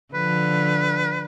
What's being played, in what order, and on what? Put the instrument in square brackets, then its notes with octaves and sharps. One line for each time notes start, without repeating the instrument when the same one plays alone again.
[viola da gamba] D3 F3 [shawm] B4